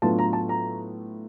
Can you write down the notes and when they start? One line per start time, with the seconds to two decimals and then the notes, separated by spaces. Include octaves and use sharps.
0.02 A2 F#3 B3 D4 F4 A5
0.19 A#5
0.33 A5
0.49 A#5